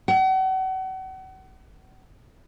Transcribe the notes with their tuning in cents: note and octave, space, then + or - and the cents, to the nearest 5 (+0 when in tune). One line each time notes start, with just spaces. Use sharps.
F#5 +35